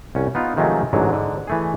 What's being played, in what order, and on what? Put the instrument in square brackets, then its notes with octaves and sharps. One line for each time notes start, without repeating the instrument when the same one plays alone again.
[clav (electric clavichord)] C2 C#4
B3 D#4 F4
C3 D#3 F3 F#3 G#3 A3
A1 G#2 D3 F#3
G#2 D3
E3 A3 G#4